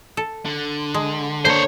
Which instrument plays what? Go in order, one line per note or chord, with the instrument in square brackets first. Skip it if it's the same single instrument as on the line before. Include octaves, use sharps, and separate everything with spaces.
[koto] A4
[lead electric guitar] D3
[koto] G#3
[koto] D3 A#3 [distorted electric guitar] C5 C#5